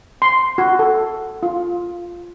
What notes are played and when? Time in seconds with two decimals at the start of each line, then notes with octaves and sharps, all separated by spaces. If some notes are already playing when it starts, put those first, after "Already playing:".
0.22 C6
0.58 F#4
0.79 A4
1.43 F4